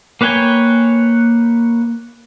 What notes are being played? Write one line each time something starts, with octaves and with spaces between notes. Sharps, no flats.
A#3 B4 C#5 G5 G#5